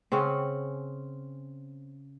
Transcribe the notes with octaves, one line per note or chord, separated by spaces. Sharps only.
C#3 C4 C#4 F#5